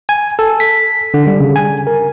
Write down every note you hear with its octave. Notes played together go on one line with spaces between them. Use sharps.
G#5
A4
B6
D3
G3
C#3
G#5
A#4